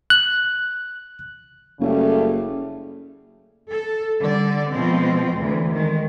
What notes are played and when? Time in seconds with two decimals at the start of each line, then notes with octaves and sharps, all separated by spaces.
0.10 F#6
1.80 F#1 C#3 G3 A3
3.71 A4
4.21 D3 G3 D5
4.72 B2 F3 G#3 C4
5.37 D2 E3
5.73 D#3 G#3